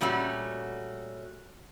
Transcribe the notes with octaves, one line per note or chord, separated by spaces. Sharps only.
A#2 G3 A3 C#4 F#4